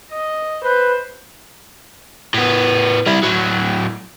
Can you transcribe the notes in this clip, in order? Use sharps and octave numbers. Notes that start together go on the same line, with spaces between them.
D#5
B4 C5
A2 B3
G3 E4
A2 F#3